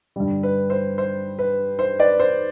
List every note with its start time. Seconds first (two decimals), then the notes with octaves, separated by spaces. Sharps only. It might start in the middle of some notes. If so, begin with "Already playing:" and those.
0.16 G2 D3 G3
0.43 B4
0.70 C5
0.98 C5
1.39 B4
1.79 C5
1.99 B4 D5
2.20 C5